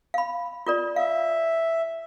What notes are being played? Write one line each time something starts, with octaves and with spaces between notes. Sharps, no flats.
F5 B5
F4 A#4 D5
E5 F5